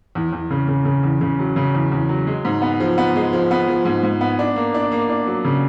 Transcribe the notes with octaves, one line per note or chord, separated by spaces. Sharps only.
E2
E2
C#3
C#3
C#3
E2
C#3
F#3
C#3
E2
E2
F#3
G#3
G#2
B3
F3
B3
G#3
F3
B3
F3
G#2
G#2
B3
D4
A#3
D4
A#3
D4
F#3
C#3